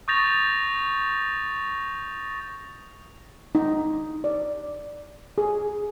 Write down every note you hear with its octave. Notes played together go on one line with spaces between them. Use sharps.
C#6 D#6 G6 A6 A#6 F7
D#4
D5
G#4